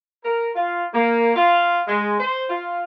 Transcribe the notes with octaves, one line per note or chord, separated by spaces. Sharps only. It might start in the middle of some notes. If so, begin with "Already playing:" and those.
A#4
F4
A#3
F4
G#3
C5
F4